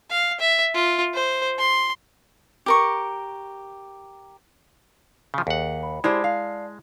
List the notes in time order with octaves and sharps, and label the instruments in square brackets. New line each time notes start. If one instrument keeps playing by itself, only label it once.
[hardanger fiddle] F5
E5
F4
C5
C6
[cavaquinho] G4 A#4 C#6
[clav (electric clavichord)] C#3 F3
[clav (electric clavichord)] D#2 F#5 [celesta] G#4
[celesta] B5
[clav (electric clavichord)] G#3 [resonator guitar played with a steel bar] E4 G4 C5 [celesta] D5 A5 F6
[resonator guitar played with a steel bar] F5